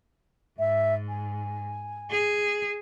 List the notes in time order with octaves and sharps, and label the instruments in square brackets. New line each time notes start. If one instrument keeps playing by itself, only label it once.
[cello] G#2 [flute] E5
[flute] G#5
[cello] G#4